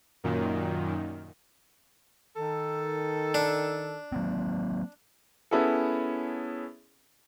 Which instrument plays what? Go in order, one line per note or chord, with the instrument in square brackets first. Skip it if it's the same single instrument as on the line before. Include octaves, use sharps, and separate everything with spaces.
[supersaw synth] F#2 A#2 D#3
[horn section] D#3 A4
[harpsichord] D4
[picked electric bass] F#3 A#3 C4
[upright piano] B3 C#4 E4 G#4 A4